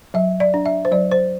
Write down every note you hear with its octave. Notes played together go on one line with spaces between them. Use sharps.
F#3 E5
D5
D4
E5
C5
F#3 D5
C5